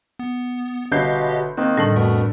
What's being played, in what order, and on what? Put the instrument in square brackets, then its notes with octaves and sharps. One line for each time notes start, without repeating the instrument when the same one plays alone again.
[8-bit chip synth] B3
[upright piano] G1 G6 C7 [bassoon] B2 [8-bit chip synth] G4 D#5 F5
[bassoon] D#3 [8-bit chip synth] A#3 F#6 [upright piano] C4
[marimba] A2 G3 [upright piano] D3 A5 F#7
[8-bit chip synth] F2 A3 A#4 [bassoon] B2